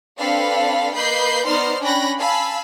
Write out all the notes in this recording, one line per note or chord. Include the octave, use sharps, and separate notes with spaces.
C4 D4 A4 B4 F5 B5
A#3 B4 D#5 B5 G6 C7
B3 D#4 C5 D5 C6 F6
C#4 D4 G5 B5 F#6 A#6
F5 G#5 A5 B5 E6